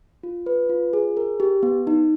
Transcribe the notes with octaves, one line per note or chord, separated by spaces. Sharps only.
F4
B4
F4
G#4
A#4
G4
B3
D#4